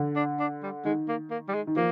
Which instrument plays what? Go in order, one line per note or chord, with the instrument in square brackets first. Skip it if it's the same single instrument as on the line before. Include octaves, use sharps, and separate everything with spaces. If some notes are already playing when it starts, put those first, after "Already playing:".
Already playing: [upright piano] D3
[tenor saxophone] D4
D4
G3
[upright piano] D#3 [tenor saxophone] G#3
[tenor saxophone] A#3
A#3
G3
G#3
[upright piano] D#3
[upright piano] F3 [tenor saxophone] A#3